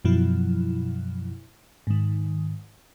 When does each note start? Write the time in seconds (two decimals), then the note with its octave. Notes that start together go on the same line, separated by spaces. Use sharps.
0.05 F#2 B2 F3 F#3 E4
1.87 G#2 D#3